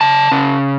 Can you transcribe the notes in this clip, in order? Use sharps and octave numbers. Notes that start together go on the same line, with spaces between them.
C#3 A5
C#3